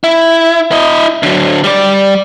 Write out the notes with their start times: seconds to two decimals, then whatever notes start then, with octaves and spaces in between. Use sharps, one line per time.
0.04 E4
0.71 E4 D#5
1.23 D3 F#3
1.64 G3 D5